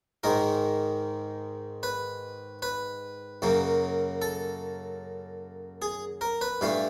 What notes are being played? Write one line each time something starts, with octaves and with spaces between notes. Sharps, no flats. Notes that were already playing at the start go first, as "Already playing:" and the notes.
G#2 D#3 G#3 A#4
B4
B4
F#2 C#3 F#3 A#3
A4
G#4
A#4
B4
G2 E3 A3 F5